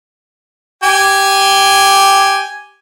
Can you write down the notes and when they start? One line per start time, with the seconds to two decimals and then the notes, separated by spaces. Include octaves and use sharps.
0.83 G4 G#5